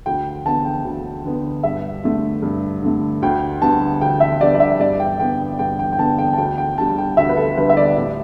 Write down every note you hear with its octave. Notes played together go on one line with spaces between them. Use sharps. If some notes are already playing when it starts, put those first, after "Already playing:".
D2 G5
D3 B3 A5
G5
D2
D3 B3
G2 E5
D3 A3
G2
D3 A3
D2 G5
D3 G3 B3 A5
D2 G5
E5
D3 G3 B3 D5
D5
E5
G2 D5
G5
D3 B3 G5
G2 G5
G5
G5
D3 B3 A5
G5
A5
D2 G5
G5
D3 G3 A5
G5
D2 E5
B4
A4
D3 G3 B4
E5
D5
A2